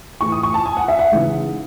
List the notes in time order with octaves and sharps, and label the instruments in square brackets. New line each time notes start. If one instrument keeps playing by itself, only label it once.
[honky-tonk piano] A2 E3 A3 C#6
D#6
C#6
A5
G#5
F#5
E5
F#5
C#3 E3 G#3 D#4